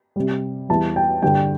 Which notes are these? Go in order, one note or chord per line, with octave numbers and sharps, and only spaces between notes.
C3 G3
E2 E3 G3 A5
G5
G2 D3 G3 G5